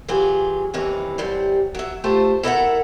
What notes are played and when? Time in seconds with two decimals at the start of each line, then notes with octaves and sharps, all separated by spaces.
0.08 E3 F#3 F4 G4 G#4
0.74 D#2 C3 E3 C#4
1.18 F#2 C3 G3
1.75 F#3 E5
2.04 A3 F4 G4 C5 A5
2.43 E4 A4 A#4 D5 E5 F#5